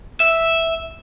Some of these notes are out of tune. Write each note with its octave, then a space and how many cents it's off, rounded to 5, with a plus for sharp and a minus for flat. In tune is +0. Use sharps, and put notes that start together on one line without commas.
E5 -5